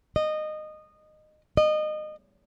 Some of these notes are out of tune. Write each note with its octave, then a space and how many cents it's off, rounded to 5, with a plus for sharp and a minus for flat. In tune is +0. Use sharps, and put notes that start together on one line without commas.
D#5 -20
D#5 -25